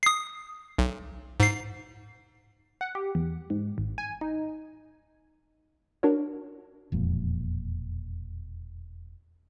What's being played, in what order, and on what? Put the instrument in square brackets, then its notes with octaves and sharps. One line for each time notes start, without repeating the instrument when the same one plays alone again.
[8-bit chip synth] D#6 C7
B1
G#2 C7
[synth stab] F#5
G4
E2
G#2
G#1
G#5
D#4
[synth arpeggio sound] D4 F#4 A#4 C#5
[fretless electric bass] E1 F2 A#2